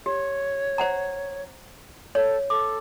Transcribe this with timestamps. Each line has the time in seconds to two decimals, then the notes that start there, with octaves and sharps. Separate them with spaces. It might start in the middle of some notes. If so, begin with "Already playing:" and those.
0.06 G4 C#5
0.78 C5 F#5 A#5
2.15 A4 C#5
2.50 A4 D6